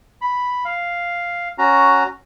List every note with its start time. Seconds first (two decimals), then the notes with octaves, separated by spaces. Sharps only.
0.21 B5
0.65 F5
1.58 C#4 F#4 A#5